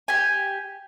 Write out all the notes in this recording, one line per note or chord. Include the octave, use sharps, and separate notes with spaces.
G4 G#5